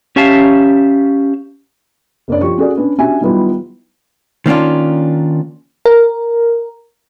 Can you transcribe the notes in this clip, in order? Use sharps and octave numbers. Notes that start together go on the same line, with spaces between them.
C#4 G4 E5 F5 A5
F#1 A#3 D4 C#5 D5
F3 G4 C#6
C#4 F#4 G#4 D5
C#4 D4 B4
C#4 D4 F#4 G4 E5 G#5
D#3 F#3 G3 B3 E4 F4
D#3 A#3 C#4 D4 F4
A#4